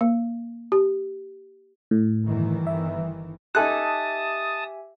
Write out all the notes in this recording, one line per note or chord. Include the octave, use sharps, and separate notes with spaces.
A#3
G4
A2
G1 D#3 E3
E5
D#4 G4 A4 E5 G#5 A5 D#6 F#6